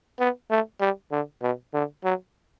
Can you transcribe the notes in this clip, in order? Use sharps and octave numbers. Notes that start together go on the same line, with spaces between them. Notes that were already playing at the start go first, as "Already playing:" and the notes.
B3
A3
G3
D3
B2
D3
F#3